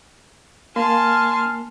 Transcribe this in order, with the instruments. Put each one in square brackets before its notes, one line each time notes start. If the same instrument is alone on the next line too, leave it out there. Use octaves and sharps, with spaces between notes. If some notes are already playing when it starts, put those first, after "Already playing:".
[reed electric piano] A#3 [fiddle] G#5 A5 [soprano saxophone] C6 [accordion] F6